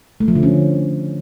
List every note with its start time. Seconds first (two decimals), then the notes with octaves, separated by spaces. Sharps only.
0.20 A3
0.28 F3
0.35 D3
0.43 C#4